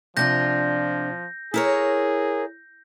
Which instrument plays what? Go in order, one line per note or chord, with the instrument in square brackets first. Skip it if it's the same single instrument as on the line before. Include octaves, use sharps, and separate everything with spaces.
[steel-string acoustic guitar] C3 D4 F4 [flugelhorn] F3 [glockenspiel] G6 A#6
[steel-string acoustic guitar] E4 A#4 C#5 [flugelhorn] G#4